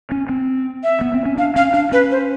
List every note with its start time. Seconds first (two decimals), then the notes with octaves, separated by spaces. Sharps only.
0.11 C#4
0.29 C4
0.83 E5
1.01 B3
1.14 C4
1.26 C#4
1.38 D4 F5
1.56 C#4 F5
1.74 D4 F5
1.92 C#4 B4
2.11 C5